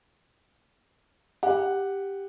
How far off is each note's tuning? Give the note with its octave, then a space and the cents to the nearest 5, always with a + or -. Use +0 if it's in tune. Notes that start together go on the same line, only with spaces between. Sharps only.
G4 +5 F#5 +0